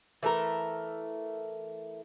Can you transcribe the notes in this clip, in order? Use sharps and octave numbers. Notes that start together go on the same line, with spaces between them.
E3 A3 A4 A#4